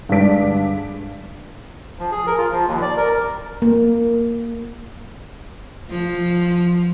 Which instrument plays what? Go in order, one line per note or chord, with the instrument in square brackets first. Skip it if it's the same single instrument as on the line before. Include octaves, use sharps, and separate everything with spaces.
[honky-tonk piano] G2 D3 G#3 D4 B6 D7
[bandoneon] F3
G#4
A#4
F4
F3
D#2
D5
A#4
[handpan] A#3
[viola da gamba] F3